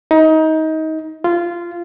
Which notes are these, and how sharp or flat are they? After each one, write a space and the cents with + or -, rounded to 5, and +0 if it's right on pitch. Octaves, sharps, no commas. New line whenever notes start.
D#4 +25
F4 -15